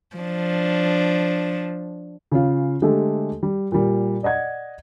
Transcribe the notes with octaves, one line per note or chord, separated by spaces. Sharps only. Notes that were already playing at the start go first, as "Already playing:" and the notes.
F3 D4
C#3 C#4 F4
D3 G#3 A3 G4 A4
G3
A#2 G3
D5 D#5 F#5 G#6